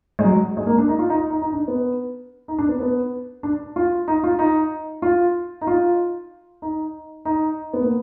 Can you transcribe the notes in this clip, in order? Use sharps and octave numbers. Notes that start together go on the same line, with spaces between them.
G#3
F#3
G#3
A#3
D4
D#4
F4
D#4
D#4
D#4
D4
B3
D#4
D4
B3
B3
D4
F4
D#4
F4
D#4
F4
D#4
F4
D#4
D#4
B3
A#3